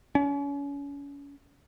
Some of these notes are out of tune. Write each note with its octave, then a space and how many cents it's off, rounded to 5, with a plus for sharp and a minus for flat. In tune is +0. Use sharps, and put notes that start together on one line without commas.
C#4 +35